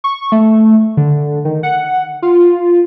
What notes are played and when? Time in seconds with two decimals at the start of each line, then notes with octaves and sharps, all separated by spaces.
0.04 C#6
0.32 A3
0.97 D3
1.45 D#3
1.63 F#5
2.22 F4